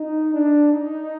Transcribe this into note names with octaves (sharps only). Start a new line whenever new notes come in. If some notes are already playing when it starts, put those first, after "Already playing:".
Already playing: D#4
D4
D#4